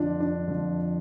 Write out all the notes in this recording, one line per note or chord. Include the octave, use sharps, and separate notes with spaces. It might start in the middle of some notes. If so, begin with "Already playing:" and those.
Already playing: F2 D3 F3 D4 F4
D4
F2 D3 F3 F4